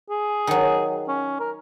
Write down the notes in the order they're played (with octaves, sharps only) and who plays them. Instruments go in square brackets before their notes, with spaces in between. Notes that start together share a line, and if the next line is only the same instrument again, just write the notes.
[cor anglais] G#4
[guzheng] D#3 F#3
[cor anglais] C#4
A#4